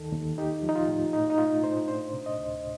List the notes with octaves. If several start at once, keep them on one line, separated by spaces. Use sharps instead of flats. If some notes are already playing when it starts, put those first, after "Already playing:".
Already playing: D#2 D#3 A4
D#2
D#4 G4
F3
D#4
F4
A2
A2 D#4
D#4
A3 F4
A2 C5
D4 C5
C3
D#5
D2